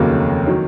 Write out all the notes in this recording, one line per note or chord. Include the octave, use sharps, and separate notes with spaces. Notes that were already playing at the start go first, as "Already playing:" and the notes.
Already playing: F1 D#2 C#3 F#3 A#3
D#3 F#3